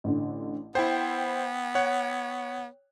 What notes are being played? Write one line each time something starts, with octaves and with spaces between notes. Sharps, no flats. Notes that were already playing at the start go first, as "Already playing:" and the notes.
A1 D3
B3 E4 C5 G5
C#5 F#5